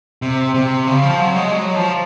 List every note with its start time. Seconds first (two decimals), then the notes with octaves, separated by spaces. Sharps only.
0.22 C3
0.54 C3
0.87 C#3
1.04 F3
1.20 F#3
1.36 G#3
1.52 F#3
1.75 F3